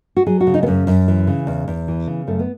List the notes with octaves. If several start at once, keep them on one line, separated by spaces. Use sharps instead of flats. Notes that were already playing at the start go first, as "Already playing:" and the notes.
F#4
F#3 G#4
F#4
C#3
D#4
B3
F#2 C#4
F#2
E3
C#3
E2
E2
E3
C#3
F#2 A3
B3